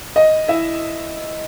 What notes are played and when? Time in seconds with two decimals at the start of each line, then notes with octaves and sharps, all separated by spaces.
0.16 D#5
0.48 E4 E5